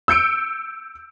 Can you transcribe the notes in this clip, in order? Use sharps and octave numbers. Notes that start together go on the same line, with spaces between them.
E6 G6 C#7 D7